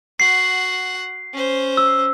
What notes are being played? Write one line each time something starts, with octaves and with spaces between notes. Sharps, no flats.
F#4 F#5 C7
C#4 C5
E6